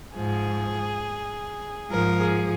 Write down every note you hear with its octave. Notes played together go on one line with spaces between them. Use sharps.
G#2 F3 G#4
G#2 F3 A#4
G#4